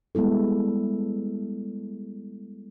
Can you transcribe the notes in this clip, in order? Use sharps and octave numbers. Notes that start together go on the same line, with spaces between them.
G3 G#3 B3 E4 A4